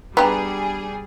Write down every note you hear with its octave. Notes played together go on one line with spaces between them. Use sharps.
G3 B3 D4 G4 G#4 A#5